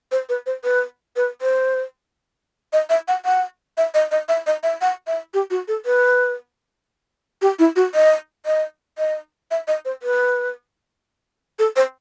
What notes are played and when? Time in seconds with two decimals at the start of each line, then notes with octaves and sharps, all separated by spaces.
0.12 C5
0.29 B4
0.46 C5
0.64 B4
1.16 B4
1.42 C5
2.73 D#5
2.90 E5
3.08 F#5
3.25 F#5
3.77 E5
3.94 D#5
4.11 D#5
4.29 E5
4.47 D#5
4.63 E5
4.81 F#5
5.07 E5
5.34 G4
5.50 F#4
5.68 A4
5.86 B4
7.42 G4
7.59 E4
7.76 F#4
7.94 D#5
8.46 D#5
8.98 D#5
9.51 E5
9.68 D#5
9.85 C5
10.03 B4
11.59 A4
11.76 C5